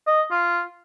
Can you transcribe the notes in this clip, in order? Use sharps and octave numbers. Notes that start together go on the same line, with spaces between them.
D#5
F4